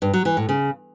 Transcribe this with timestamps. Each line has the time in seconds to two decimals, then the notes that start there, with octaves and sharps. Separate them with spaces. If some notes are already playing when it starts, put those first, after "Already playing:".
0.02 G2
0.14 F#3
0.25 E3
0.37 A2
0.49 C#3